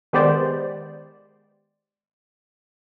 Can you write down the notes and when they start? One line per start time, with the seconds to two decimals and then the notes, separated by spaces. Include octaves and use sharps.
0.13 D#3 G#3 B3 G4 C5 D5